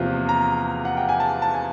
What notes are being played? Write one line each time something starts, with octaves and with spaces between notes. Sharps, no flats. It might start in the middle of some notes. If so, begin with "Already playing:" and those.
Already playing: E2 C3 F3 A#3
A#5
F#5
G5
G#5
A5
A5
G#5